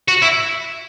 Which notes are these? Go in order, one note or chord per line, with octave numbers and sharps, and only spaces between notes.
F#4
E4